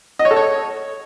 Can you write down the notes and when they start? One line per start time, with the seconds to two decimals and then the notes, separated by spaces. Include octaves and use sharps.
0.19 D#5
0.25 C#5
0.31 A4
0.36 C#5